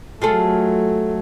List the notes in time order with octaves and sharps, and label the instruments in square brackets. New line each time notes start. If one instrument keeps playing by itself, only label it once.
[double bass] F#3 A3 [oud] F4 G#4 A4